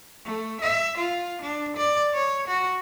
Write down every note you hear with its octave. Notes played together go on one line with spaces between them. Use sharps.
A3
E5
F4
D4
D5
C#5
F#4